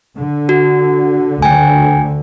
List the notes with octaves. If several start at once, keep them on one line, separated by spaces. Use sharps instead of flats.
D3
F#4
D2 D3 G5 G#5